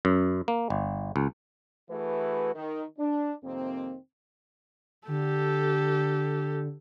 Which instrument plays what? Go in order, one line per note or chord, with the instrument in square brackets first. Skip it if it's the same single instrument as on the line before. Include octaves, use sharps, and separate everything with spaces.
[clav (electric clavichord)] F#2
A#3
G1
C#2
[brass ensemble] E3 A3 F#4 G#4 B4
D#3
D4
F2 C3 D#3 A#3 C4
[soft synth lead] D3 [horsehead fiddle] G4 A4